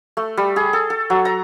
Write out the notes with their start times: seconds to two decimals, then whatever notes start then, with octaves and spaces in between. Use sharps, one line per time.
0.17 A3
0.37 G3
0.56 G#4
0.73 A4
0.90 A4
1.10 F#3
1.25 A#5